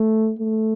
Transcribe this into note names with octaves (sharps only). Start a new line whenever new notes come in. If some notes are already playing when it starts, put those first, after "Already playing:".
Already playing: A3
A3